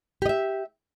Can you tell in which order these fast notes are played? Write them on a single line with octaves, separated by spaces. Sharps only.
G4 D#5 E5